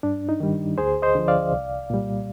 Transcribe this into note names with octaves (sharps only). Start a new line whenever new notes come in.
G2 D4
D#4
D#3 G3
D2 G#4 C5
C5 D#5
D3 F3
D5 F5
C2
A#2 G3